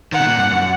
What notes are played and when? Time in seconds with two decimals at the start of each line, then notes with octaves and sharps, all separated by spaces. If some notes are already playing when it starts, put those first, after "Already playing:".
0.12 D#3 F#5
0.19 C3
0.26 A#2
0.38 G2
0.51 F#2